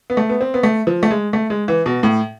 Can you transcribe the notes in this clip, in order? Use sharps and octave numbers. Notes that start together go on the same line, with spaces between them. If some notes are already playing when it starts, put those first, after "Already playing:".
B3
A3
B3
C4
B3
A3
F3
A3
G#3
A3
G#3
E3
B2
A2